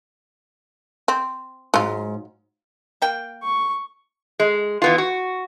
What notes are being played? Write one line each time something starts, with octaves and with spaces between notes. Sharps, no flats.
C4
G#2 F#3 F4
A#3 G5
C#6
G#3
E3 B3 F4
F#4